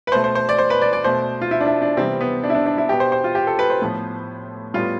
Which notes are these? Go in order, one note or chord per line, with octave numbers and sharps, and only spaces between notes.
B4
B2 A3 C5
C5
C5
D5
C5
B4
D5
D5
B2 A3 C5
F4
E4
D4
E4
D4
C3 E3 G3 B3 C4
B3
D4
E4
D4
D4
E4
B2 B3 G4
C5
C5
F4
G4
A4
B4
C5
A2 F3 B3
A2 G3 B3 F4